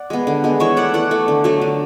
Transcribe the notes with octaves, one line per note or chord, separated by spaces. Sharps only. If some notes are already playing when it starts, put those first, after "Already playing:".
Already playing: D5 F#5
G#3 B3
D3
G#3 B3
E3 C#5 E5
A3 D5 F#5
E3 D5 F#5
A3
D3
F#3 A3
D3